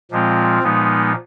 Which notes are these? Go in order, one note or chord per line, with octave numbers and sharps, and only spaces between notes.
A#2 F3 G#3 C4 F4
A#2 F3 G#3 B3 D#4